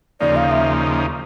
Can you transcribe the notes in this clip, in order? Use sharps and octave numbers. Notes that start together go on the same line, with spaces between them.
D#2 C#3 F3 A#3 D#4 D5
F5
E5